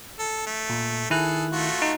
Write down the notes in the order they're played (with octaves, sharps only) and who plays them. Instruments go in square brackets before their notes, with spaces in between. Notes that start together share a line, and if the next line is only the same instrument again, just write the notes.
[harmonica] A4
A3
[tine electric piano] A#2
[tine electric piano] D#3 E4 F#6 [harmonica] G#4 A4
[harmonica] A3 F4 F#4
[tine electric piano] D#4